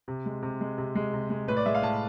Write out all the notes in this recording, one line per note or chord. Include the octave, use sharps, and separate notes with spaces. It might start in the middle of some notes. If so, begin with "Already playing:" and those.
C3
G#3
C3
G#3
C3
G#3
C3
G#3
A2 B4
D5
G#3 E5
F5
A2 A5